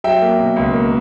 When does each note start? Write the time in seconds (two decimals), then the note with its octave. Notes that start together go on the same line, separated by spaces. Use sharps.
0.04 F#3 E5 G5
0.22 A#3
0.39 B2
0.56 C#2
0.74 A#3